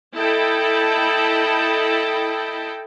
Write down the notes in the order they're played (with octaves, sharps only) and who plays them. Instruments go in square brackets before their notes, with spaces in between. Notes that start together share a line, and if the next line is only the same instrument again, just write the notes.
[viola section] E4 A4 D#5 G5 A5 B5